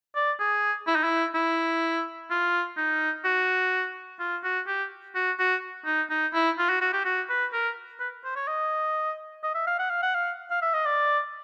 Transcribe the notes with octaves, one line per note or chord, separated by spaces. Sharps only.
D5
G#4
E4
D#4
E4
E4
F4
D#4
F#4
F4
F#4
G4
F#4
F#4
D#4
D#4
E4
F4
F#4
F#4
G4
F#4
B4
A#4
B4
C5
C#5
D#5
D#5
E5
F5
F#5
F5
F#5
F5
F5
E5
D#5
D5